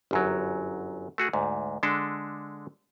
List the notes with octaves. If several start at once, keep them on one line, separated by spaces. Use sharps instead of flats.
G1 F#2 F#3
A3 F#4 G#4
D2 G#2
D3 G#3 D4 A4